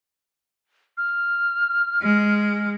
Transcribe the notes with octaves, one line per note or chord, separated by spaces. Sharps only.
F6
G#3